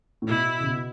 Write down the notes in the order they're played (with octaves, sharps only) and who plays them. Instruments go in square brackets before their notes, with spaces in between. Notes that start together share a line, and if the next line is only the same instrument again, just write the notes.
[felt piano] A2
[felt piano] B2 [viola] E4
[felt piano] C#3
B2